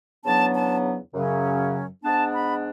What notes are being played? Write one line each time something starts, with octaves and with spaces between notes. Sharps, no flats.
E2 C#3 F#3 B3 D4 A5
A5
F#2 C#3 F#3 C#4
G#2 G#3 B3 D4 A5
B5